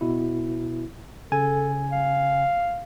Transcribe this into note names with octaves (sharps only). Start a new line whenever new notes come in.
B2 E4
C#3 A4 G#5
F5